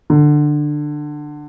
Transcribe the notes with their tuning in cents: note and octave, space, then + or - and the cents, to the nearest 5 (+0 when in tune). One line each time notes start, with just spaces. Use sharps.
D3 +15